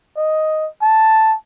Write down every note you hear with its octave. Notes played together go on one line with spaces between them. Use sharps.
D#5
A5